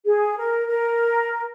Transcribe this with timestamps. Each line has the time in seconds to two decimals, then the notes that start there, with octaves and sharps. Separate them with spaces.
0.04 G#4
0.37 A#4
0.67 A#4